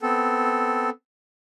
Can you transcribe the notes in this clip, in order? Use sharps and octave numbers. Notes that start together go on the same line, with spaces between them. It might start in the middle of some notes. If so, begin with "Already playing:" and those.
B3 C4 A4